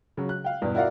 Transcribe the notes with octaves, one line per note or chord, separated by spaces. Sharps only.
C#3 F#3
F#6
F5 G5
E2 G2 B2
E4 F#4 A#4 D5 F5 F#5